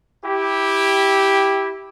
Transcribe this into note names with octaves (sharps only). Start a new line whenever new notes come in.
E4 G4